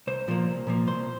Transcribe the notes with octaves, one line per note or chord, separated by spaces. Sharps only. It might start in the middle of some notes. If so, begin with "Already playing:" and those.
C2 C5
A#2 F3 A#3
C2
A#2 F3 A#3
C2 C5